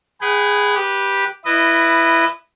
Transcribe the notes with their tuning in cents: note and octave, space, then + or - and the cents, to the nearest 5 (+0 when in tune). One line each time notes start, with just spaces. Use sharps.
G#4 -10 B4 +5 G5 -45
G4 +0 B4 -15
E4 +10 B4 +0 D#5 -20